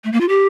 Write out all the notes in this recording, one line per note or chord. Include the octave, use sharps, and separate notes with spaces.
A3
A#3
F4
G4